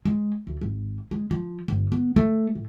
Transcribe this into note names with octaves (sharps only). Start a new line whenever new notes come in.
G#3
D2
G#1
G#3
F3
G1
B3
A3
A2